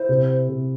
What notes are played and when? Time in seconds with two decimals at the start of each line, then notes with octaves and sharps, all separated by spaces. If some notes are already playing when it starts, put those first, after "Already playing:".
Already playing: E4 C5
0.09 C3
0.49 C3